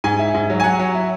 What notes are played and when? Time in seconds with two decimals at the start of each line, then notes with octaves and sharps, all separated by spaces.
0.04 G#2 G#5
0.19 E4
0.34 G#2
0.50 F#3
0.60 G#5
0.64 F#3 F#5
0.79 F#3
0.95 E4